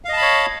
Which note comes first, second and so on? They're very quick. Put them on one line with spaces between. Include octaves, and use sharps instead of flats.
F5 D#5 A5 B5 C#5